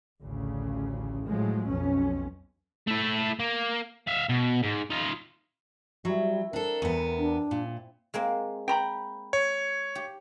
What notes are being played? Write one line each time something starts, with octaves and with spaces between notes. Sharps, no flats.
A1 D2 C#3
A2 F3 F#3 G#3
B1 F2 C#4
A3 E4
A#3
E5 F5
B2
G#2
D#4 F4
F#3 G3 C4 E4
C4 D4 A4 A#4
E2 B3
D4
A#2
G#3 A#3 C4
G5 A#5 B5
C#5
G4